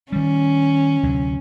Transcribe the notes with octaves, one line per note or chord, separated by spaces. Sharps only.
D#3 G3 C#4
D2 C3 F#3